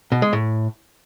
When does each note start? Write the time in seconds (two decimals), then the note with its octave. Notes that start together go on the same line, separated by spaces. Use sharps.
0.12 B2
0.22 G#3
0.33 A2